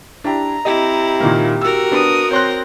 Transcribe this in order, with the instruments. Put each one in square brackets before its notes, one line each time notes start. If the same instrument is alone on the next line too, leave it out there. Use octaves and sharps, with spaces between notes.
[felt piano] D4 E4 G4 [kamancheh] A#5
[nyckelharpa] C4 E4 [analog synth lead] G4 [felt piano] D#5
[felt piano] A#2 D#3 A#3
[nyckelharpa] F#4 A#4 [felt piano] E6
[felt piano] B3 D4 [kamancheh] D#6
[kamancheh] C4 [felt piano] C#5 C6 F#6 [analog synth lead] A#6